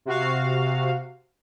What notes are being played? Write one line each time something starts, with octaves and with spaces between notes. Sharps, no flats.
C3 F#4 F5